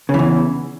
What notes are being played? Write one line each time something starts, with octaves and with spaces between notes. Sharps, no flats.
E2 C#3 E3